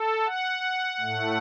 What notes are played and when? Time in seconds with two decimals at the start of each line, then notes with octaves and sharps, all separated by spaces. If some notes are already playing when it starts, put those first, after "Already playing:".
Already playing: A4
0.25 F#5
1.00 A2 A3